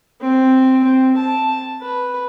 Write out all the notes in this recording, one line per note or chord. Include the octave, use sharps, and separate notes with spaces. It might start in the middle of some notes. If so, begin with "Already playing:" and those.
C4
C4
A5
B4